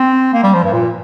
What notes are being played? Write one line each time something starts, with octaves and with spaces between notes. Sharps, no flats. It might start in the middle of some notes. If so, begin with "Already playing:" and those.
Already playing: C4
A#3
G3
F3
G2
A#2